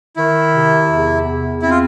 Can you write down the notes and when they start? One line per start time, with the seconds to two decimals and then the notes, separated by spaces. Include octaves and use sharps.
0.16 D#3 E4
0.52 C3
0.89 E2
1.25 E2
1.62 C4 E4
1.70 F4